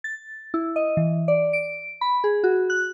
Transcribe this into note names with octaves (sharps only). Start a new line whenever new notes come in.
A6
E4
D#5
E3
D5
D7
B5
G#4
F#4
F#6